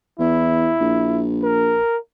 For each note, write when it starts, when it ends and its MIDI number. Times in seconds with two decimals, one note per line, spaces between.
0.20 0.73 40
0.20 1.24 64
0.81 1.79 34
1.43 1.98 70